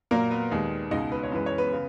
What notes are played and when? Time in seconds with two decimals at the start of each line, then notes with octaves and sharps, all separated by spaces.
0.11 A#2 F#3 A#3 A#4
0.31 B3 B4
0.51 D#2 D#3 G#3
0.91 C#2 B2 G#3 D#4 D#5
1.12 B4
1.23 C#5
1.32 F#2 E3 G#3 B4
1.46 C#5
1.58 B3 B4
1.73 C#3